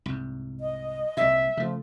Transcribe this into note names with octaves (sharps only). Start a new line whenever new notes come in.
C2 G#2
D#5
C2 A#2 E5
C#3 F3 A3